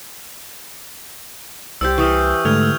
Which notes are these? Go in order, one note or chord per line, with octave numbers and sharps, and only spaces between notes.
C2 G4 C5 D5 E6 G6
E3 G4 C5 C#6 D#6 F6
G#2 D3 A3 F6 G#6 F7
E6